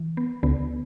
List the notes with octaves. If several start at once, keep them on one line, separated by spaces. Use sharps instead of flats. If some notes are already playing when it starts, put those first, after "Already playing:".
Already playing: E3
B3
D2 D3 B3